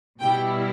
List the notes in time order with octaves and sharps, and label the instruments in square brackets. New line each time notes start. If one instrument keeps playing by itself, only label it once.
[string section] B2 G3 E4 G5